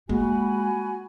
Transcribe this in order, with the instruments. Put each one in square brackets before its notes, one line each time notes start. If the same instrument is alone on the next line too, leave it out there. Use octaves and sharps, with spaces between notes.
[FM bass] G#3 [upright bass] A#3 F4 [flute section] F#4 G#5 B5